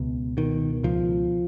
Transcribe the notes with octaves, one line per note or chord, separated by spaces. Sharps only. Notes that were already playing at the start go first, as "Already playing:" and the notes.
Already playing: C#2 B2
B2 D#3
C#2 F3